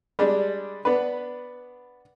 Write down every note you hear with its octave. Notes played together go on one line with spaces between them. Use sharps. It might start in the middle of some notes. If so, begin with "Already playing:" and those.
G3 G#3 D4
B3 D4 B4